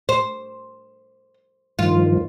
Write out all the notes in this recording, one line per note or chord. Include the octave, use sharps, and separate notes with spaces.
C5
G2 D#3 F3 F4